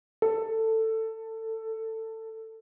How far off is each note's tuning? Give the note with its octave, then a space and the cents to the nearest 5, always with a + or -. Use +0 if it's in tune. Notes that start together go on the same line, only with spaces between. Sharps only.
A4 +20